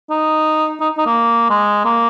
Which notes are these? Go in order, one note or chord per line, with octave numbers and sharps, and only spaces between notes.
D#4
D#4
D#4
A#3
G#3
A#3